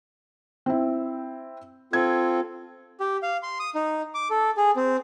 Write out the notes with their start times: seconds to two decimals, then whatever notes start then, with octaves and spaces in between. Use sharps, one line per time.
0.66 C4 E4
1.93 C4 F4 A4 G#6
3.00 G4
3.23 F5
3.43 C6
3.60 D#6
3.75 D#4
4.14 D6
4.30 A4
4.57 G#4
4.76 C4